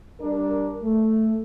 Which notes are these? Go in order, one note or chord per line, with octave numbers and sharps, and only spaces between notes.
G3 D4 A#4
A3